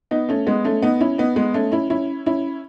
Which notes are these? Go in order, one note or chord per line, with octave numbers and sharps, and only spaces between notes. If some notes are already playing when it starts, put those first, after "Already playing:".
B3 D#4
A3 C#4
G#3 B3
A3 C#4
B3 D#4
C#4 E4
B3 D#4
G#3 B3
A3 C#4
C#4 E4
C#4 E4
C#4 E4